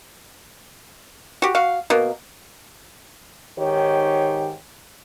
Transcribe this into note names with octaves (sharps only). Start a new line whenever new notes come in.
F#4 G4
F#4 F5
B2 A#3
G#2 D#3 G4 C#5